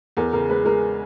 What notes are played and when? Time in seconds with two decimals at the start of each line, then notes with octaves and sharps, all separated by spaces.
0.17 E2 A#4
0.33 C#3 A#4
0.50 G#3 B4
0.65 G#3 A#4